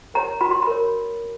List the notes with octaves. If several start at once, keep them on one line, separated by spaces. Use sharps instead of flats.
A#4 C#5 A#5
F#4 B5
C6
B5
A#4 C#5